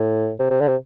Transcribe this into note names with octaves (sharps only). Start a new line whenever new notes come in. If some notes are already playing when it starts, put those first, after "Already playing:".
Already playing: A2
C3
C3
D3
C3